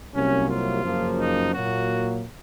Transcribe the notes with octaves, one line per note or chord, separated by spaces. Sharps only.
C2 C3 F#3 A#3 C#4
F4
F#2 C#3 F3 A#3
D#4
A#2 F#3 A#3 F#4